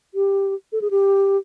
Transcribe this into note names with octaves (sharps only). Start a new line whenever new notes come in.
G4
A4
G#4
G4